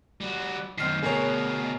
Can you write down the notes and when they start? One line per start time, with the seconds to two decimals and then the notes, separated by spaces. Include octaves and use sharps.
0.21 G3 F#4
0.78 F#2 D#3 C4 F6 C7
1.03 D2 B2 G#4 A#4 C#5